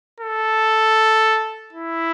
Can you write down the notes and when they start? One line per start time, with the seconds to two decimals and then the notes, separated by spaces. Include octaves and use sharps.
0.21 A4
1.73 E4